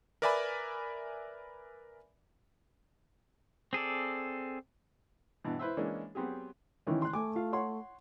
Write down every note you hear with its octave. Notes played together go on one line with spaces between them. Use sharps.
A#4 B4 D5 E5 G#5 B5
C4 G#4 A4 D5
G2 B2 E3
E4 B4 C5 E5
E3 G#3 A#3 C#4 D4
F#3 B3 C4 G4 G#4
D#3 E3 C#4
C6 F#6
A3 G#5 D6
F4 F5
C#5 F#5 C6